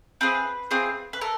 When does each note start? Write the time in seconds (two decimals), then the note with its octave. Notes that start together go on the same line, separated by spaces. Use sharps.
0.21 C4 F4 G#4 B4
0.71 C4 F4 G#4
1.13 B4
1.21 A4 A#4